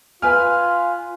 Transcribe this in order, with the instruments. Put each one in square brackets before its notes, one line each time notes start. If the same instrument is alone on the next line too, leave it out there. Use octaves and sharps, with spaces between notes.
[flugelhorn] F4 [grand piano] B4 G#5 F6